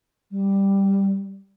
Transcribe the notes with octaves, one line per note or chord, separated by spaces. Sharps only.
G3